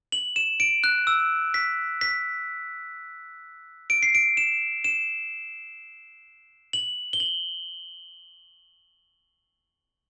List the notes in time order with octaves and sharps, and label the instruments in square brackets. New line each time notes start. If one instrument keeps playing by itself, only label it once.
[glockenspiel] F#7
E7
D7
F#6
E6
B6
B6
D7
C7
D7
E7
E7
F#7
G7
F#7